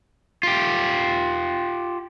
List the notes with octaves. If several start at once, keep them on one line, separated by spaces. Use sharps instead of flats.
F4 G4